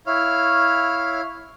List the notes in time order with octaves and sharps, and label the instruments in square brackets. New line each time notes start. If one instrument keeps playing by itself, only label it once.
[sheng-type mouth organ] E4 C#5 F5 F6